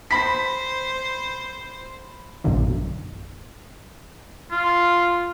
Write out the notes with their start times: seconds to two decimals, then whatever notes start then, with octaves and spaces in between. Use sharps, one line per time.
0.11 C5 B5 B6
2.44 A#1 F#2 B2 D3 D#3
4.52 F4